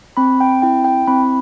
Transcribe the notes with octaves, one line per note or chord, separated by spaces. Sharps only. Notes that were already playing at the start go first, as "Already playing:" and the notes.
C4 B5
G5
E4 G5
G5
C4 B5